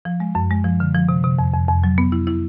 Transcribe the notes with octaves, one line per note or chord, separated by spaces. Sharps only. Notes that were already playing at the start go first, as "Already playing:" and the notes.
F3
G#3
F#2
G#3
F3
D3
F3
C3
C3
F2
F2
F2
F#3
B3
E4
E4